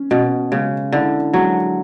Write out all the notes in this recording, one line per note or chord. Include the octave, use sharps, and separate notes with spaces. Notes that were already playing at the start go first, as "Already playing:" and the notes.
Already playing: C#4
B2 C#4
C#3 G#3
D3 E4
F#3 G#3